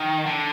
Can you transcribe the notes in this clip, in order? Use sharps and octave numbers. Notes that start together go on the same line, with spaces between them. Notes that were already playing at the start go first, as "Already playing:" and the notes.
Already playing: D#3
D3